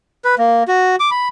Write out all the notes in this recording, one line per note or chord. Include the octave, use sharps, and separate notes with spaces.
B4
A#3
F#4
D6
B5